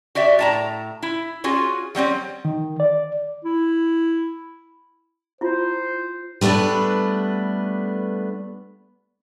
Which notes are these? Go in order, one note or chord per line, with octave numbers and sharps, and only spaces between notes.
F#4 G4 D5 E5
A2 A5 A#5
E4
C#4 F4 F#4 G#4
F#3 G3 C4 C#4
D#3
D5
E4
E4 F4 C5
G3 A3 B3 D4 B4